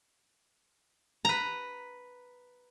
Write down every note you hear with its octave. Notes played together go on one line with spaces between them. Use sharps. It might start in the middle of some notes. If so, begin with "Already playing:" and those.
B4 A#5